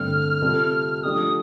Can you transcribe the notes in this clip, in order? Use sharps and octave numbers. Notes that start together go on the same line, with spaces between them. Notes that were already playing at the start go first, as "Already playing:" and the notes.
Already playing: G2 D3 A3 C4 F6
C3 G3 C4 F4 A4
F3 A3 D4 G4 D#6